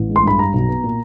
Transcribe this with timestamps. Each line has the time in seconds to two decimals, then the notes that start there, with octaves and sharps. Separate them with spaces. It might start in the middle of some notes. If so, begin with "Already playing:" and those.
Already playing: A1
0.09 G#3
0.16 C6
0.24 G2 B5
0.38 G3 A#5
0.54 B1
0.69 B3
0.84 A#2